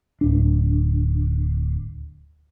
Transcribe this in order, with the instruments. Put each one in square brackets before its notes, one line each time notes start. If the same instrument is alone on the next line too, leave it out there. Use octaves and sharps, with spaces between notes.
[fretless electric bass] D1 D4